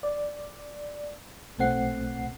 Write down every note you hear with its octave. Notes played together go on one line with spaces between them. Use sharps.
D5
B1 A#2 A3 C4 F#5 C7